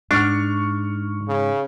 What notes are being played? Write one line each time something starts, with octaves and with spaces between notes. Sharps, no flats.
G#2 D4 C#6 F6
C#3